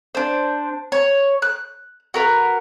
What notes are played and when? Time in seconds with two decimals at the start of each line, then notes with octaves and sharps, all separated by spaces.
0.15 D4 C5
0.92 C#5
1.42 F#6
2.14 F#4 A#4 B4